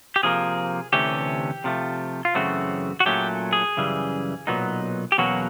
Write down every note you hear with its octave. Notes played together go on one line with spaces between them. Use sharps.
G4
C3 F3 A#3 G#4
D2 C3 E3 A3 C#4 G4
C3 F3 A3
F4
F#2 C#3 E3 A3 C4 F#4
F#4
A#2 F#3 A3 C#4 G4
G#4
F#2 C#3 E3 G3
B1 A#2 F#3 B3 D#4
G4
E2 B2 F#3 A#3 C#4 F#4